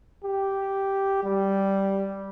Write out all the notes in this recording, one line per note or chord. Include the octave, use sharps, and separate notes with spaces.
G4
G3